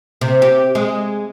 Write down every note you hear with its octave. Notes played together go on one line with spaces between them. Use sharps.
C3
G4
G#3